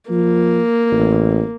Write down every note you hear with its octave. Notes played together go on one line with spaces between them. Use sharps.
F3 A#3
A1